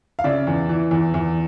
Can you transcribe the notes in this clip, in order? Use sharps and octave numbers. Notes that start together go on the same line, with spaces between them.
F5
C#3 D5 E5
E2
E3
E2
E2